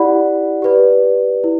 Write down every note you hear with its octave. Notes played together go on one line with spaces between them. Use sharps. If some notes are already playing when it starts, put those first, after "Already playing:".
Already playing: E4 G4 D5 F#5 B5
G4 B4 D5
E4